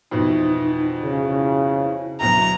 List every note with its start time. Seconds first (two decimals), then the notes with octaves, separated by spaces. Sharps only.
0.11 F2 B2 E3 D#4
1.04 C#3 E4
2.20 D2 B2 F#3 A#5